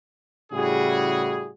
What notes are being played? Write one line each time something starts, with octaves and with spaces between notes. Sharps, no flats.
A2 C#3 G3 E4 F#4 G#4